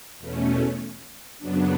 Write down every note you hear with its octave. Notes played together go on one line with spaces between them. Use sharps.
E2 B2 A3 C#4
F#2 C#3 F#3 B3 D4